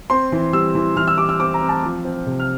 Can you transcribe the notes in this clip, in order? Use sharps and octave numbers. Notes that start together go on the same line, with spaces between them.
C4 C6
E3
G3 E6
E3
E3 F6
E6
G3 D6
E6
C4 D6
A#5
C4
A5
F3
C4
C3
F6